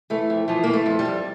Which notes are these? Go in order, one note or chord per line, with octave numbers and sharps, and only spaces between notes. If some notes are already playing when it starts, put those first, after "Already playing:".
E3 A3
F2
E3 F3
E3 A#3
A3
F2
G3
F2